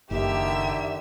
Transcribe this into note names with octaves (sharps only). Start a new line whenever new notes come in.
F#1 D3 D#3 G4 E5 E6